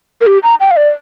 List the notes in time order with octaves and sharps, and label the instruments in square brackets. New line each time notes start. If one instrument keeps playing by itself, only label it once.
[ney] A#4
G4
A#5
G5
F5
D5